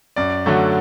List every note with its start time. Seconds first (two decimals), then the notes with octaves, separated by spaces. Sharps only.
0.16 F#2 D5
0.46 D3 F#3 A3